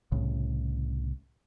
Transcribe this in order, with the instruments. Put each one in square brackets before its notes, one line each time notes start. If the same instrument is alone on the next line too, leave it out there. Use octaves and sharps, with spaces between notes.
[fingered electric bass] C2 A2 C#3